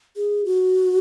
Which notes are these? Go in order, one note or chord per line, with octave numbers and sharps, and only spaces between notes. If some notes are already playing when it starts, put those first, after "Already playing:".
G#4
F#4